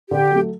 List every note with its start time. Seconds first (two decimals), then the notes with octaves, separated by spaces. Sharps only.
0.11 D3 G4
0.31 F#3 A3